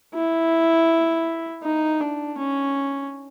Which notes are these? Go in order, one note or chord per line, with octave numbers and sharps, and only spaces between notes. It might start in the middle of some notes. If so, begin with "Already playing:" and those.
E4
D#4
D4
C#4